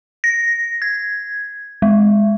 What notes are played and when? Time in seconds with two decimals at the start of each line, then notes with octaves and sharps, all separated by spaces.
0.24 A#6
0.82 G#6
1.82 G#3